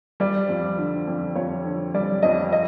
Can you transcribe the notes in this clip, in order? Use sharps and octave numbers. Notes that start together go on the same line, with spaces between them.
G3 D5
F2
D3
F2
F2 C#5
D3
G3 D5
F2 D#5
D#5